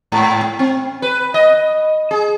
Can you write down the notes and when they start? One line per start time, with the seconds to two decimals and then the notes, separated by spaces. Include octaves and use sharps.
0.12 G#2
0.59 C4
1.02 B4
1.34 D#5
2.11 G#4